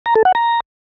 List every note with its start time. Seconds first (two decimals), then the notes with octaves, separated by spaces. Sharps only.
0.06 A#5
0.16 A4
0.25 F#5
0.35 A#5